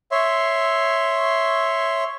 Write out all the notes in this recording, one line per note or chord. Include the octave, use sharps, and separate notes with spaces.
C#5 E5 C6